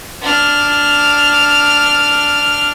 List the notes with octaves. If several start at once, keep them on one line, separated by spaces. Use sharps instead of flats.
D4 F6